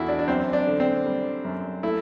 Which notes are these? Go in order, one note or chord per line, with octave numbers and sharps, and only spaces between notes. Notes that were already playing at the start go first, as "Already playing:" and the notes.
Already playing: E2 A3 E4 F#4
D4
D4
F#2 C4
D4
D3
C4
G3
F#2
A3 E4